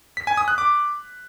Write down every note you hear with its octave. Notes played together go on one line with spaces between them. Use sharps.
B6
G#5
D#6
F#6
D6